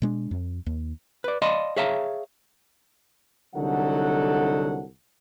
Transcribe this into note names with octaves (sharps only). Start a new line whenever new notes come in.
B2 G#3 D4
F2
D#2
B4 D5
D5 D#5 F5 A5 B5 C6
G#4 C#5 E5 F5 A5 A#5
C2 D3 F#3 D#4 A4 F#5